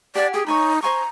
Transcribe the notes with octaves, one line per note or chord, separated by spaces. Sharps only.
G4 D5 F#5 G#5
G4 G#4
D#4 C#5 G#5 B5
C5 G#5 A#5 C#6